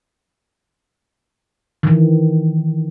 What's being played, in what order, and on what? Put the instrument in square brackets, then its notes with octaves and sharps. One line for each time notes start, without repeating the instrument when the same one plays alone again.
[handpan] D#3 E3